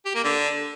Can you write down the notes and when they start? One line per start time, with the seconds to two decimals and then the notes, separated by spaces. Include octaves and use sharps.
0.05 G4
0.15 A#3
0.24 D3